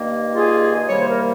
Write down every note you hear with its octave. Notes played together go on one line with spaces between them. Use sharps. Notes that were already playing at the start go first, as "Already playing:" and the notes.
Already playing: G2 D#3 A#3
F4 G#4
C2 C3 D#3 G3 A#3 C#5
C5
A#4